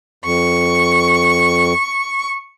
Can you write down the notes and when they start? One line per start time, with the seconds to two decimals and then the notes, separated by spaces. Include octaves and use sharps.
0.24 F2 C#6